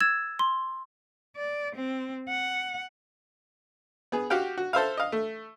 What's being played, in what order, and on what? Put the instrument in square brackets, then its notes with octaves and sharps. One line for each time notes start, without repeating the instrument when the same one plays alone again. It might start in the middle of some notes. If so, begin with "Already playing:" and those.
[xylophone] E6 G#6 A6 E7
C6
[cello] D5
C4
F#5
[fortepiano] B3 G#4
F#4 G4 F5 G5
F#4
A4 C5 E5 F5
D#5 F5
A3